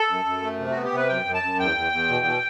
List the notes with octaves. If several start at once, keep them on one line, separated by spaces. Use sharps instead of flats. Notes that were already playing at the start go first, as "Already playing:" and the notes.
Already playing: A4
F#2
F#2
A3
C3
F#4
B3
G4
C3 B4
F#2 G5
F#2
A5
F#2
E2 G5
E2
E2
B2
B2